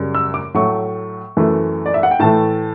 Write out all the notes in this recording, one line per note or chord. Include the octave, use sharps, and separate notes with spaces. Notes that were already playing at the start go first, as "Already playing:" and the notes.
Already playing: F#2 C#3 G3
E6
D6
A2 F#3 A3 C#6
F#2 E3 A3
D5
E5
F#5
G5
A2 E3 A3 A5